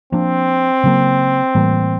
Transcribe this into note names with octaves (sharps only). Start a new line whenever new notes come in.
F3 A#3 C4 D4
C#3 F#3 A#3
A2 E3 G3 A#3